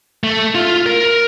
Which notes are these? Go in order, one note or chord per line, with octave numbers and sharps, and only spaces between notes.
A3
F4
A#4